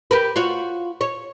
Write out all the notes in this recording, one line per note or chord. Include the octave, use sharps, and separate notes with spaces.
G4 A#4 B4
F4 F#4 C#5
C#5